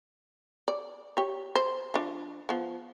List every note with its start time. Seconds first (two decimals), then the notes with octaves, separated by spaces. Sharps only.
0.68 D5
1.17 G4 C#5
1.55 C5
1.94 F3 D4
2.49 F3 B3